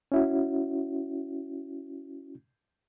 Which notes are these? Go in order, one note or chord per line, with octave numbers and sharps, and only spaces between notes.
C#4 E4 F#4